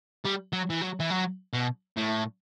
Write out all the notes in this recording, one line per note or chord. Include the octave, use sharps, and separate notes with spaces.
G3
F#3
E3
F#3
E3
F#3
B2
A2